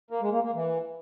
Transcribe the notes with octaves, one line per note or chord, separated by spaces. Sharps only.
A#3
G#3
A#3
A#3
E3